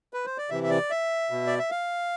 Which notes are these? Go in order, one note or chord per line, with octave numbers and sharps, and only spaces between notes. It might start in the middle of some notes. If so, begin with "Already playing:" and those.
B4
C5
D5
C3 E3 E5
E5
D5
E5
B2
D5
E5
F5